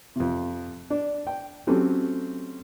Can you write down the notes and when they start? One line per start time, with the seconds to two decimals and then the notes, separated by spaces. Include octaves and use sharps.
0.16 F2 C3
0.90 D4
1.27 G5
1.67 F#3 A3 C4 C#4 G4